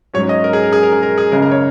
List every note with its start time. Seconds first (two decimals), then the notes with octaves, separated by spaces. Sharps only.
0.14 G#2 F#3 C#4 C#5
0.29 D#5
0.44 A#4
0.53 G#4
0.63 A#4
0.73 G#4
0.83 A#4
0.93 G#4
1.03 A#4
1.18 G#4
1.32 F#1 F#2 C#3 G#3 A#4
1.42 A#4
1.52 C#5